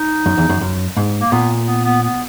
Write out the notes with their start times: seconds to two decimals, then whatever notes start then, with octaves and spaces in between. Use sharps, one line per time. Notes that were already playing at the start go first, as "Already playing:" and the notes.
Already playing: D#4
0.26 F#2
0.37 E2
0.49 F#2
0.61 F#2
0.97 G#2
1.21 A#3
1.32 A#2 B3
1.67 B3
1.85 B3
2.03 B3